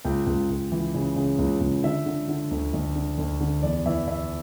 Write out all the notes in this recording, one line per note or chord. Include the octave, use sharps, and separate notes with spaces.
C#2 G5
C#2
C#2
E3
C#3
C#3
C#2
C#2
D3 E5
D3
D3
D2
D2
D3
D2
D3
E2 D5
E3 E5
E2 E5